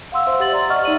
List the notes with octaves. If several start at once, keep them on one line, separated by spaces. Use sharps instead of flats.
F5 F#5 C6 E6
C5 E5
G4 F#5 C6 A6 F#7
D5 A#5
D#5 E5 F#5 C#6 F6 A6
D#4 D5 D#7 F#7